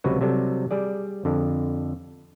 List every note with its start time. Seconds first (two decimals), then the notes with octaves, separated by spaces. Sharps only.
0.04 C#2 C3 F3 F#3 F#4 B4
0.21 C3 F#3 G3 A4
0.71 G3 G#4 D5
1.25 F2 D3